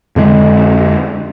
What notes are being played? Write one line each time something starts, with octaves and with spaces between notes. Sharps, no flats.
F2 D3 G#3